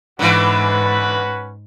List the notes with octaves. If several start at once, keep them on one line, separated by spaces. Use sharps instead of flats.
G#2 D3 E3 C#4 F#4 B4